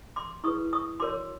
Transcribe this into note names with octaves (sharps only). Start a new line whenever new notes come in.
C6 D6
E4 G#4 B4 C#6 D#6
C#6 D#6
F#4 A#4 C#5 C6 D6